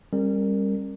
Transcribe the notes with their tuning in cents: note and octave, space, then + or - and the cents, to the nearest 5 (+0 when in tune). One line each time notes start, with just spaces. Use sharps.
G3 +30 C#4 -35 A#4 -20